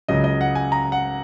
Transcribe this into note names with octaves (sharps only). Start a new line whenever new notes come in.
C#2 C#3 F#3 D#5
D#5
F#5
G#5
A#5
F#5